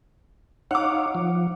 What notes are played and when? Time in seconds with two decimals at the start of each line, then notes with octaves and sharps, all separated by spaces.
0.71 D#4 C#5 F5 F#5 D6
1.15 F3